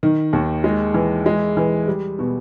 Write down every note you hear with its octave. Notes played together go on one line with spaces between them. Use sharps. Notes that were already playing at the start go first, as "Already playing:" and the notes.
D#3
D#2
G#3
E3
G#3
E3
G3
B2